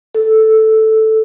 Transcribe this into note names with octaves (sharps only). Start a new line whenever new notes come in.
A4